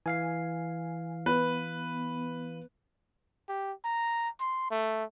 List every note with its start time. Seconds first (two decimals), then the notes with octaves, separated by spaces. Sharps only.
0.06 E3 F5 G#5 C7
1.26 B3 B4
3.49 G4
3.84 A#5
4.40 C6
4.71 A3